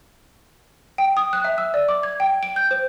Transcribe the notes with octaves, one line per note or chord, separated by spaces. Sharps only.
G5
D#6
F#6
E5
E6
D5
D6
G#6
G5
D7
G6
C5